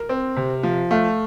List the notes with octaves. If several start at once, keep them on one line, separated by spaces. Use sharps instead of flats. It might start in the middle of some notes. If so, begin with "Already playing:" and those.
Already playing: A#4
C4
C3
F3
A3 F5